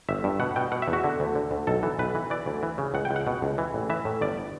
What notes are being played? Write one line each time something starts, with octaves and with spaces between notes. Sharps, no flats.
G1 E5
G2
B2 F#5
B2 G5
B2 F#5
E5
E2
F#4
D3
D2
D3
D2
B1 A4
E3
B1 B4
E3
E3 D5
D2
E3
C#3
C#2 F#5
G5
C#2
F#5
B2
C#2
E3
A1
E3 E5
A2
G1 D5